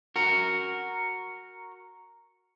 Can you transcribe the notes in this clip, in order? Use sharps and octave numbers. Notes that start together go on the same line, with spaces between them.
F#4 A#4